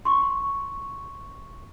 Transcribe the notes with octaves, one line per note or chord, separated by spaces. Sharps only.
C6 C#6